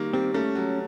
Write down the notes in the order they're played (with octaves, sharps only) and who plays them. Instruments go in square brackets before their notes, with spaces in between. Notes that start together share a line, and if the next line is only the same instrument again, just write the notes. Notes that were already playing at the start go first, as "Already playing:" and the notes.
Already playing: [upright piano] D#3 G3 A#3
[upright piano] G3 [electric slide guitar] C4
[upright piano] A3 [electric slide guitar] C#4
[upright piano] F#3